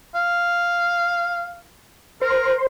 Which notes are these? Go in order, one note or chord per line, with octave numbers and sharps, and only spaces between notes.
F5
A#4 C5